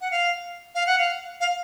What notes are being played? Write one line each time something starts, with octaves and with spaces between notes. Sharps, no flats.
F#5
F5
F5
F#5
F5
F5